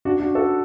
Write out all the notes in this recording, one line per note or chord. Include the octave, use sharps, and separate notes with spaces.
D4 F#4
D4 F#4
F#4 A4